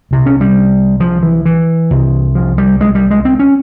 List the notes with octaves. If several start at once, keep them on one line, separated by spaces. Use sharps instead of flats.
C2 C3
C#4
G3
F3
E3
E3
C2 C3
F3
G3
G#3
G3
G#3
C4
C#4